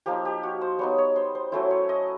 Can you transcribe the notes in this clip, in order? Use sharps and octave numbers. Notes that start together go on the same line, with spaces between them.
F3 A#3 D#4 G4
G4
F#4
C5
G3 B3 D#4 C#5
C#5
C5
C5
F#3 A3 C#4 E4 C5
C#5
D#5